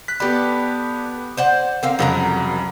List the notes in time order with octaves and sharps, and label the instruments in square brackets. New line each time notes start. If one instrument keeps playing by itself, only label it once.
[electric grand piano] F#6 B6
[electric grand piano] B3 G4 B5 [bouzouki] A4 D5
[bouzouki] C5 D5 F#5
[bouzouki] D3 C4 F5 [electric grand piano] A#4
[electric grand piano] C2 F2 C#3 [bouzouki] F#3 A#4 A#5